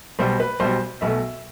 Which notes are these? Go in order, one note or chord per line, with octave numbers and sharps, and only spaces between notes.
B1 B2 G3 C5
B4
B1 B2 G3 C5
B1 B2 A3 E5